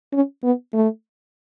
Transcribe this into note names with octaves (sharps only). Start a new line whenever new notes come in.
C#4
B3
A3